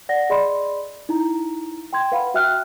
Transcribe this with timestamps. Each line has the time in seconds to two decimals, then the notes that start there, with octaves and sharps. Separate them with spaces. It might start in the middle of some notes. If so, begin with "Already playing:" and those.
0.09 D5 F#5 A#6
0.30 G#4 D5 D#5 B5 C6
1.09 D#4 E4 A#5
1.93 G5 C6 G#6
2.12 B4 F5 F#5 B5
2.34 F#4 E5 G5 F6 F#6